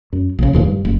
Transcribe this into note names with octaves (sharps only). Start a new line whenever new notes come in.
F#2
A#1 C#3
D1 D#2 A#2 F3
G2
F#1